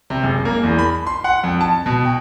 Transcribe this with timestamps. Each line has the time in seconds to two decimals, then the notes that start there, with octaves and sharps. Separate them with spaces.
0.10 C3
0.24 F#1
0.45 A#3
0.63 E2
0.79 B5
1.07 C6
1.24 F#5
1.43 F2
1.61 A5
1.86 B2
2.05 G5